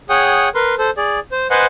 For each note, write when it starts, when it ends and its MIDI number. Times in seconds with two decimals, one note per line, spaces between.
0.09 0.49 68
0.09 0.49 73
0.09 0.49 78
0.09 0.49 79
0.09 0.49 87
0.55 0.75 70
0.55 0.75 71
0.55 0.75 84
0.78 0.90 69
0.78 0.90 72
0.97 1.19 68
0.97 1.19 74
1.32 1.47 72
1.50 1.66 71
1.50 1.66 72
1.50 1.66 75
1.50 1.66 78
1.50 1.66 80
1.50 1.66 84